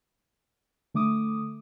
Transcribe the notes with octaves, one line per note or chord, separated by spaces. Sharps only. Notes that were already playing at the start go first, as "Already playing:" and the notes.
D3 A3 D6 D#6